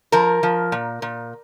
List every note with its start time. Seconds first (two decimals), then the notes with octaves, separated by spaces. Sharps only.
0.12 F3 A#4
0.43 F3
0.72 A#2
1.02 A#2